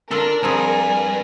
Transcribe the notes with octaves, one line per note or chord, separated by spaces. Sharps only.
D4 F4 A4 A#4 A5
G2 F3 C4 G#4 G#5